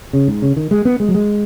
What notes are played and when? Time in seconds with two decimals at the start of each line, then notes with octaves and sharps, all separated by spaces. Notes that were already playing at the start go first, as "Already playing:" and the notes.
0.13 C#3
0.28 G#2
0.42 C#3
0.56 D#3
0.71 G#3
0.85 B3
1.00 G#3
1.08 F#3
1.14 G#3